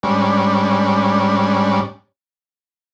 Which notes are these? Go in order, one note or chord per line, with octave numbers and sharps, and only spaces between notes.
G#2 G3 C#4 D4